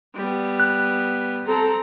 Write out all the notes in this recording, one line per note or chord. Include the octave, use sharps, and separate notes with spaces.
G3 B3
F#6
C4 A4 A#5